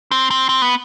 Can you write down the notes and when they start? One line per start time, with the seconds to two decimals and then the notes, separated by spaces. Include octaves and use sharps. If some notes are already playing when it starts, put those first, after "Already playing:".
0.11 C4
0.30 C4
0.49 C4
0.62 B3